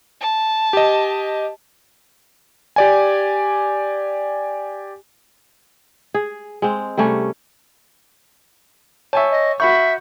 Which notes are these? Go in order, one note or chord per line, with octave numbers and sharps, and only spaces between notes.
A5
G4 D#5
G4 D5 G#5
G#4
G#3 C4
C3 G3 A3 C#4
C#5 E5 G#5 A5 C#6
D#5
F#4 E5 B5 C#6 G6